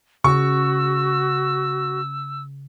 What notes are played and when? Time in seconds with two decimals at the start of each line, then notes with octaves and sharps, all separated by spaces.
0.24 C#3 F#4 C#6 E6